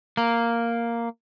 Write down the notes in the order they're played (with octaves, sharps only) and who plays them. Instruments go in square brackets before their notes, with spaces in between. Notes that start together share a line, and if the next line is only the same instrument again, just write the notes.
[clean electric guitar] A#3